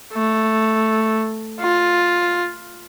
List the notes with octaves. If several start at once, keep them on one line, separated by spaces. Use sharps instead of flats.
A3
F4